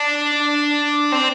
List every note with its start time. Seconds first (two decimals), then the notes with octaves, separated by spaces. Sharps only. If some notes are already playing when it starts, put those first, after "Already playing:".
Already playing: D4
1.12 C4